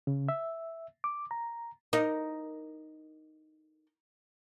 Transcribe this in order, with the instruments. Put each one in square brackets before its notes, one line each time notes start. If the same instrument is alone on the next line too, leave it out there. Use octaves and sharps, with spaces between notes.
[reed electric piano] C#3
E5
D6
A#5
[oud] D#4 A#4